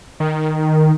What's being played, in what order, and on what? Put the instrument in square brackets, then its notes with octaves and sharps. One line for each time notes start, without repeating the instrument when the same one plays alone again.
[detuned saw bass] D#3